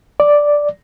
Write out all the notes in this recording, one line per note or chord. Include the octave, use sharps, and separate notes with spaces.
D5